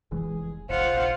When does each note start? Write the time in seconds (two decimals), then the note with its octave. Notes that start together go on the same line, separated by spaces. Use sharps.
0.12 F1 E3 G#3 G#4
0.70 F1 A#1 F4 C5 F#5